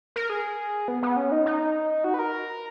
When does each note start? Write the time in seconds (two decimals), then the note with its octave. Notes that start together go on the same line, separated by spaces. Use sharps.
0.16 A#4
0.30 G#4
0.88 B3
1.03 B3
1.17 C#4
1.32 D#4
1.46 D#4
2.04 F#4
2.14 B4
2.19 A#4